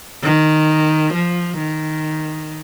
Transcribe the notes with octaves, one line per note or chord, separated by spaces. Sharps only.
D#3
F3
D#3